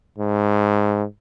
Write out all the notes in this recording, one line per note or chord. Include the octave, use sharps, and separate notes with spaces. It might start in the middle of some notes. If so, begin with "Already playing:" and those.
G#2